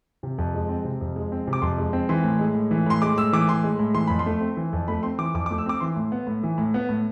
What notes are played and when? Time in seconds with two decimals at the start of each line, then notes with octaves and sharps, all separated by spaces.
0.23 C3
0.38 F2
0.54 G#3
0.69 C4
0.85 C3
1.01 F2
1.16 G#3
1.32 C4
1.47 C3
1.53 D6
1.62 F2 C6
1.78 G#3
1.93 C4
2.09 E3 C6
2.24 A2
2.39 G#3
2.55 A2
2.71 E3
2.86 A2 C6
3.02 G#3 D6
3.17 A2 E6
3.33 E3 D6
3.48 A2 C6
3.64 G#3
3.79 A2
3.94 E3 C6
4.07 F2 B5
4.19 C6
4.26 A3
4.41 C4
4.57 E3
4.73 F2
4.88 A3 B5
5.03 C4 C6
5.18 E3 D6
5.34 F2 D6
5.46 D6
5.51 A3
5.58 E6
5.66 C4 D6
5.80 E3 C6
5.96 A2
6.12 B3
6.27 A2
6.43 E3
6.58 A2
6.74 B3
6.89 A2